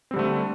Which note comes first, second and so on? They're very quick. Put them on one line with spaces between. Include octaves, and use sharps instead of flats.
C4 G3 D3 A3